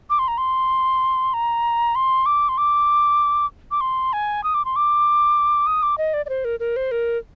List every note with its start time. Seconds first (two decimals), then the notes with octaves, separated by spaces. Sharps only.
0.10 D6
0.19 C6
0.28 A#5
0.38 C6
1.34 A#5
1.95 C6
2.26 D6
2.49 C6
2.58 D6
3.71 D6
3.81 C6
4.13 G#5
4.43 D#6
4.54 D6
4.65 C6
4.76 D6
5.67 D#6
5.83 D6
5.98 D#5
6.14 D5
6.26 D5
6.29 C5
6.45 A#4
6.60 A#4
6.76 C5
6.91 A#4